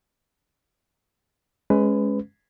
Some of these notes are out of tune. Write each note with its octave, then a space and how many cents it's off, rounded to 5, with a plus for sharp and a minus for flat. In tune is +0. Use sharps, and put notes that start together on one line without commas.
G#3 +10 C#4 +0 B4 +20